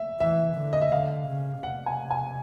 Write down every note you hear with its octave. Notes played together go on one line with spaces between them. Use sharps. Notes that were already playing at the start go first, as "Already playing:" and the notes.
Already playing: E5
E3 E5
D3
D#5
E5
D3 F5
C#3
C3 F#5
G#5
G#5